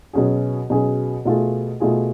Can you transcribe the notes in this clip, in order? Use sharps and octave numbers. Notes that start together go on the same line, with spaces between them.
B2 F#3 C#4 G#4
B2 F#3 C#4 G#4
B2 A3 F4 G#4
B2 A3 F4 G#4